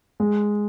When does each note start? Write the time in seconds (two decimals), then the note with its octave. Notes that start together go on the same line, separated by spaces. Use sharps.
0.20 G#3